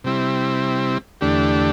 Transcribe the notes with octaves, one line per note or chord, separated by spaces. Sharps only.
C3 G3 C4 E4
E2 D3 A3 D4 G4